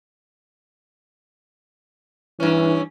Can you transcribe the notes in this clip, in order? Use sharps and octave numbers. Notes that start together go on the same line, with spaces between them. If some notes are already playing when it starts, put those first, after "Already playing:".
G2 E3 C#4